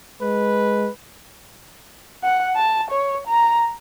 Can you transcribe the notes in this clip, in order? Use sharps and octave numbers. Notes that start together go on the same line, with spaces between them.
G#3 B4
F#5
A5
C#5
A#5